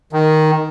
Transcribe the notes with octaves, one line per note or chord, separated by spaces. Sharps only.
D#3